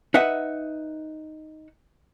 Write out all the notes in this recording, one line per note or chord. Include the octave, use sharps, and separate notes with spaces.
D#4 B4 E5 F#5